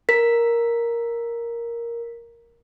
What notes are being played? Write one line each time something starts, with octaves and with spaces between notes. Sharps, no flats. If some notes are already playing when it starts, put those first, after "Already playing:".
A#4 B6